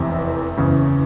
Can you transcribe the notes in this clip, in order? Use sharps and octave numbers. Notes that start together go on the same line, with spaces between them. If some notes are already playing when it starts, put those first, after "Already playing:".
Already playing: F1 E2 C3
F#1 E2 C#3